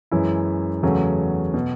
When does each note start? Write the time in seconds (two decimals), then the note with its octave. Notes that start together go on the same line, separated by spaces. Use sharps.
0.11 F#2 E3 G#3 C#4 E4
0.83 E2 C#3 F#3 A3 C#4
1.54 B2